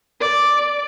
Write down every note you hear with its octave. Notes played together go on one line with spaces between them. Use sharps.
D5